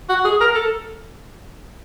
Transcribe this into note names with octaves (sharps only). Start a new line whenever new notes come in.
F#4
G#4
A#4
A4